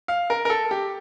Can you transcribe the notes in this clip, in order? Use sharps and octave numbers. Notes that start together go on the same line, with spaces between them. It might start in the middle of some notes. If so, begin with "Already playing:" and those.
F5
A#4
A#4
A4
G4